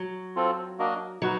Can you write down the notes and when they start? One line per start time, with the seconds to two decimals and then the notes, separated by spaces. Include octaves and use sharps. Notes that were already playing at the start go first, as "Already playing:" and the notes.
Already playing: F#3
0.36 C4 F4 A4
0.78 A#3 D4 F#4 A#4 D#5
1.22 F#3 D#4 F#4 B4